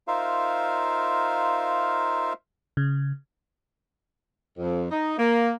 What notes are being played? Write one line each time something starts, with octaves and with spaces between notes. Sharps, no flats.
D#4 F4 A#4 C5 E5 F5
C#3
F2
D#4
A#3